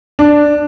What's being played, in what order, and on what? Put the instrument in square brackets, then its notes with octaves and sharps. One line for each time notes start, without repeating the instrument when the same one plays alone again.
[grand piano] D4